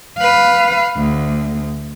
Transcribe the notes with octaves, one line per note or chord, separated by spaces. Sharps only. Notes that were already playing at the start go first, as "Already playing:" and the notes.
B4 F5
D2